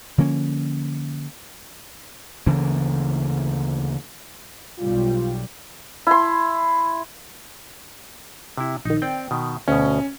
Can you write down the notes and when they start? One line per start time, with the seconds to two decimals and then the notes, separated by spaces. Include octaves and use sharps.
0.18 D3 F3 A#3 C#4
2.46 D2 C#3 E3 A#3
4.79 B1 G3 F4
6.07 E4 C6
8.57 C3 E4
8.85 A#1 D#3 D#4
9.02 C4 D5 G5
9.31 B2 D#3
9.68 D2 B2 C#4